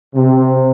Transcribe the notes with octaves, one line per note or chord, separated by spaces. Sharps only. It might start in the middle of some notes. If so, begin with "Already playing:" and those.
C3